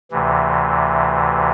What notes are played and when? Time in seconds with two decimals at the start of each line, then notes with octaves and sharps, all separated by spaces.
0.11 D2 C3 E3